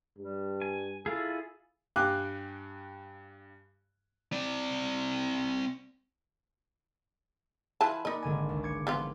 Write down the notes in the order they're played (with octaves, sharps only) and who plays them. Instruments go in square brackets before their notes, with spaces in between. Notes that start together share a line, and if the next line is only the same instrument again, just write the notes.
[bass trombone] G2 [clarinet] G3
[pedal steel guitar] G#5
[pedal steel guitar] E4 F4 G#4 [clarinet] A4
[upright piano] G2 F5 G5 G#5 D6 F#6
[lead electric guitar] C4 D5
[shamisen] E3 F4 A5 [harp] G#5 B5 F#6
[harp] A#3 D5 B5 [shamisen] D#4 D#5
[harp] G#1 D3 G#5
C#2
D6 G#6 C#7
[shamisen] F3 B3 F4 [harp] F#6